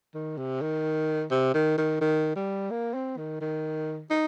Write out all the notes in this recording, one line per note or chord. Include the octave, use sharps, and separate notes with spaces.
D#3
C3
D#3
C3
D#3
D#3
D#3
G3
A#3
C4
D#3
D#3
D#4